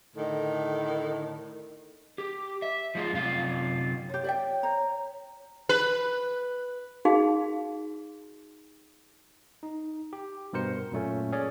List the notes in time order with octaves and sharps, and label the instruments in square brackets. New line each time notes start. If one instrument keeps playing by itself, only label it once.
[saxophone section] A2 D3 D#3
[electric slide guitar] G4
E5
F3 G#3 E4 F4
F#2 C3 F4 F5
[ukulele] F4 G4 [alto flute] C#5
[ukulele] D5 E5 G5
C5 A#5
[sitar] B4
[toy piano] D#4 F#4 G#4 F5
[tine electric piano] D#4
G4
G2 B2 A#4 C5 C#7
F#2 A#2 A3 C#4
C#4 G#4 C#5 D5